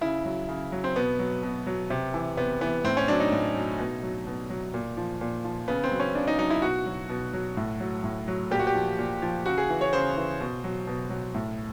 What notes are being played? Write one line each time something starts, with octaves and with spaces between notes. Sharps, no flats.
C#3 E4
F#3
C#3
F#3
C4
B2 B3
F#3
B2
F#3
C3
E3
C3 B3
E3 B3
A2 C4
C#4
F#3 D4
D#4
A2
F#3
B2
F#3
B2
F#3
A#2
F3
A#2
F3
C#3 B3
C4
F#3
C#4
C#3 D4
D#4
F#3 D#4
E4
B2 F#4
F#3
B2
F#3
A2
F#3
A2
F#3
A#2 G4
F#4
G4
F3
A#2
F3
C#3 F#4
G#4
E3
C#5
C#3 C5
E3
B2
F#3
B2
F#3
A2